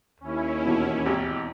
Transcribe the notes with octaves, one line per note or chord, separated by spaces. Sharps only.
D#2 C#4 E4
E2 B2
G#1 G4